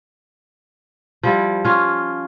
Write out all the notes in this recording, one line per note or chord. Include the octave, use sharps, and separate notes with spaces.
F3 G3 E4
C#4 F4